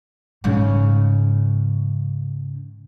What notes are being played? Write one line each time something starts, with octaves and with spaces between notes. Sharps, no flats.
G#2 C#3